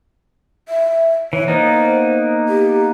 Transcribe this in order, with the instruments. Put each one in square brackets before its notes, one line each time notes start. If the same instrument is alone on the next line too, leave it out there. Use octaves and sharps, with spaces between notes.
[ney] E5
[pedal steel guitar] E3 [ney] C#5
[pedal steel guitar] A#3 B3 D#4 [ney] C5
[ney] G4